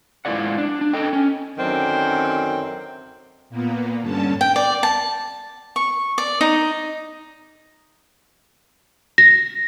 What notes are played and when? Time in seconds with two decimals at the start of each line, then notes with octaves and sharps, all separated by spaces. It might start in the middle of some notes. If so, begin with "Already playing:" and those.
0.25 G#2 A#3 E4 F4 D5 F#5
0.58 D4
0.81 D4
0.93 A4 D#5 G5
1.13 C#4
1.58 F#2 D3 D#3 F#3 C4
3.50 A#2 A#3 B3
4.02 G2 D3 C#4 A5
4.41 G5
4.56 D5
4.83 A5
5.76 C#6
6.18 D5
6.41 D#4
9.18 A#6